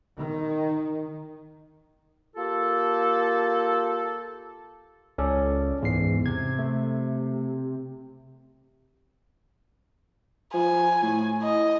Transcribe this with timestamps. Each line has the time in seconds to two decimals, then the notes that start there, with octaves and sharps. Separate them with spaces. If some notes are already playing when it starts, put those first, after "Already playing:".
0.18 D#3
2.36 A#3 F4 G4 A4
5.18 C#2 C#4 A4 D5
5.82 E2 G#2 C7
6.26 C3 G#6
6.59 A3
10.53 F3 G#5
11.02 A2
11.43 D#5